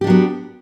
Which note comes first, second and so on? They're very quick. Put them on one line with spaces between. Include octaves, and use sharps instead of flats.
G4 D4 F#3 B3